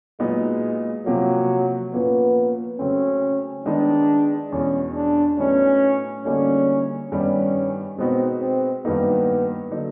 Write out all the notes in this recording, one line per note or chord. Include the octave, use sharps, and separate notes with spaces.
A#2 F#3 G#3 B3 D#4
C3 F3 F#3 A#3
A#2 F3 A#3 B3 C#4
C#3 F#3 A3 C4 C#4
D#3 G#3 B3 D4 D#4
E2 B2 G#3 C#4
D4
A2 F#3 B3 C#4 D#4
D3 G3 A#3 C#4 D#4 F#4
G2 D#3 G3 B3 C#4
B2 G#3 B3 C4 D#4 F#4
C4
G2 D#3 F#3 A#3 B3 D#4
D3 F#3 A#3 D#4